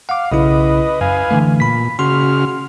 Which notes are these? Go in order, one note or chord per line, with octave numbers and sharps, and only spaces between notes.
F5 F#5 D6
B1 C#3 E4 B4 D#5
F#2 B4 F5 G#5
D3 E3 A3
A#2 B5 B6
C#3 F#4 C6 F6